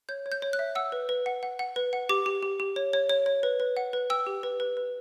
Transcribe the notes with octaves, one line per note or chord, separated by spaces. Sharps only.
C#5 G6
C#5
G6
C#5
F#6
E5
F#5 E6
B4
B4
F#5
F#5
F#5
B4
F#5
G4 D6
G4
G4
G4
C#5
C#5
C#5
C#5
B4
B4
F#5
B4
G5 E6
G4
B4
B4
B4